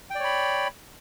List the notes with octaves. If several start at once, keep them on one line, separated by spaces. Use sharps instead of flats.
C#5 D5 G5 B5